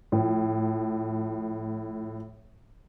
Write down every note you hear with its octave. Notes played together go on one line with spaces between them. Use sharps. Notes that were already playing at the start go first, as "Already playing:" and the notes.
A2 F3